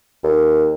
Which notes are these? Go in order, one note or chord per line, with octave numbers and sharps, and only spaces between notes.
D#2